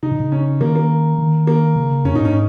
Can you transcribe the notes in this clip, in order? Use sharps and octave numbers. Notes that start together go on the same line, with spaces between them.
C#3 D#4
A#2
C#3
C#4
D#3 A#3
A#3
D#3
A#3
C#3
F2 C#4
A#2 D#4
G#2 C#4